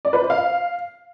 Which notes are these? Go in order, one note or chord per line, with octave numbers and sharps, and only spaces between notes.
D5
B4
C5
F5